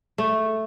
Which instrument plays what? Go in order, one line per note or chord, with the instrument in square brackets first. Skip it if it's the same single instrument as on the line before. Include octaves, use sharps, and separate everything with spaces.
[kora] A3